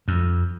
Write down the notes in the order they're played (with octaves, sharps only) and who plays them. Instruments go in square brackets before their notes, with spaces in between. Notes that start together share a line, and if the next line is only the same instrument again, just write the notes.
[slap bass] F2